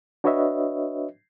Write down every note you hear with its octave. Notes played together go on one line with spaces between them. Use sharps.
D4 F#4 B4 C#5 D#5 E5